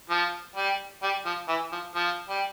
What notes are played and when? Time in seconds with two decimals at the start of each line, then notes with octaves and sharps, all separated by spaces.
0.10 F3
0.56 G3
1.03 G3
1.25 F3
1.48 E3
1.72 F3
1.95 F3
2.29 G3